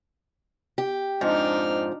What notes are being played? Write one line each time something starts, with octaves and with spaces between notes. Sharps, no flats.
G4
F2 G#2 F3 D4 D#4 F6